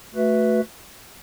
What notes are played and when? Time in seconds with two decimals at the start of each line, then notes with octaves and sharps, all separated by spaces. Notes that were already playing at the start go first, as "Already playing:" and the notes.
0.14 A3 F#4 B4 E5